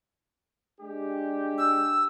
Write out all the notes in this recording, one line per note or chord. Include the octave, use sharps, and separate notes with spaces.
G#3 D4 G4
E6